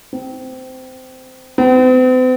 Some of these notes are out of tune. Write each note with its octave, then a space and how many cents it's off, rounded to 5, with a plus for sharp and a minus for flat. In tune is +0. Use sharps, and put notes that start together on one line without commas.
C4 -20
C4 -45